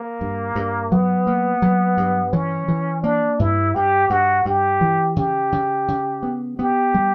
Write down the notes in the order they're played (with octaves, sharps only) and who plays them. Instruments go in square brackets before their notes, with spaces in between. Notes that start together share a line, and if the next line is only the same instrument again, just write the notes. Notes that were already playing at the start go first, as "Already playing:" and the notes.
Already playing: [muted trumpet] A#3
[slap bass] G2
G2
[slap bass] F#3 [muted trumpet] B3
[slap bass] A#3
F#3
G2
[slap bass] E3 [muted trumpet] C#4
[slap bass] E3
[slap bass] A#3 [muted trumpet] D4
[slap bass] G2 [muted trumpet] E4
[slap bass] G2 [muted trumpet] G4
[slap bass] G2 [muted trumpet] F#4
[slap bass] G2 [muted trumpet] G4
[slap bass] E3
[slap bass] C#3 [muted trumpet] G4
[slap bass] C#3
C#3
B3
[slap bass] B3 [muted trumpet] G4
[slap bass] G3